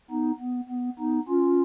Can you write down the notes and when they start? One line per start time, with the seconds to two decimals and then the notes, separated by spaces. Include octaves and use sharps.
0.11 B3 D#4
0.40 B3
0.69 B3
0.99 B3 D#4
1.28 C#4 F4